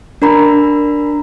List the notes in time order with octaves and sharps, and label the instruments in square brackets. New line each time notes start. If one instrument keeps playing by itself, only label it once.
[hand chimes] D4 A#4 A#5 B5